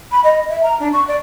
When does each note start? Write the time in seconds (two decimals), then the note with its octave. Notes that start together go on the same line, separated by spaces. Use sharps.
0.11 B5
0.23 D#5
0.49 E5
0.62 A#5
0.79 D4
0.92 C#6
1.07 D5